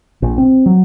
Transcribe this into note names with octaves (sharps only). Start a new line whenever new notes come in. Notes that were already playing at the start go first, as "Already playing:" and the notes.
A#1
C4
F#3